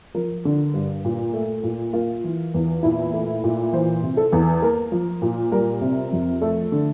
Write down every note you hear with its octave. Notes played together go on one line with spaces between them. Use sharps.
F3 A#4
D3
G2
A#2
A3
A#2
A#3 F4
E3
E2
A#2 E4
A3
A#2
E3 C5
C3
A4
E2
A#3 A#4
F3
A#2
G3 A#4
C3
F2
A3 A4
D3